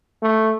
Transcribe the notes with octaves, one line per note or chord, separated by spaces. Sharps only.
A3